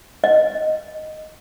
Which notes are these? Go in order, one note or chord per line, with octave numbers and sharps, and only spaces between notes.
D#5